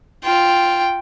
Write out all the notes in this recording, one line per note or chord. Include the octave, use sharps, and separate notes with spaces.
F4 G5